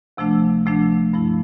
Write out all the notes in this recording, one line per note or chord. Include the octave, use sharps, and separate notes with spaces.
D2 C3 F3 A3 D4
D2 C3 F3 A3 D4
G2 F3 A3 E4